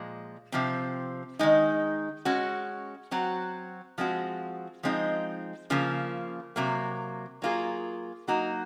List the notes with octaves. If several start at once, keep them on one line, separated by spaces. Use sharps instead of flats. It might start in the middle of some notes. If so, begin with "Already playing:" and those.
Already playing: A#2 F3 G#3
C3 F3 C4
D#3 G#3 D#4
G#3 C#4 F#4
F#3 C4 F#4
F3 G#3 C4 F#4
F3 G#3 C4 D#4
C#3 F3 A#3
C3 F#3 A#3
F#3 A#3 F4 G#4
F#3 A#3 D#4 F#4